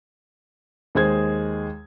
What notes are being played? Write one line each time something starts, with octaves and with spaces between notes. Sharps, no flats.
D#2 G#3 G#4 C5 G#6